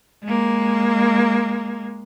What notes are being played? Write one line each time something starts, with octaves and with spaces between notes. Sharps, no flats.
G#3 A#3